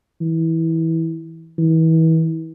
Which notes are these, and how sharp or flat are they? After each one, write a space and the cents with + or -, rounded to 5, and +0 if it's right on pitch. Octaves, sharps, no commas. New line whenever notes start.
E3 -20
E3 -35